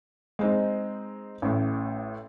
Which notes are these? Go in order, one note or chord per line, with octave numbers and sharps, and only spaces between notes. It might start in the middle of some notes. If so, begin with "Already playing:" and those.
G#3 C4 D#4
A1 A2